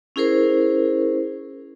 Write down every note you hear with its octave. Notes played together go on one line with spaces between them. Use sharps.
C#4 E4 G#4 A#4 C5